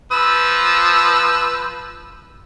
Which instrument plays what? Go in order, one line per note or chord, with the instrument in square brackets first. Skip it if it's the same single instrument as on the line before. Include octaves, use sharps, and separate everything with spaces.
[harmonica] F3 B4 E6